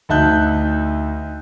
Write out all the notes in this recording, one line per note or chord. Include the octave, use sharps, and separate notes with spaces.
D2 D#4 E5 A5 F#6 G6